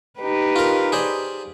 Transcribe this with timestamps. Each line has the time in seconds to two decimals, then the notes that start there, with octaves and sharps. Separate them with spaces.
0.20 D#4 G4 B4
0.56 F4 A#4
0.92 G#4 C5 D5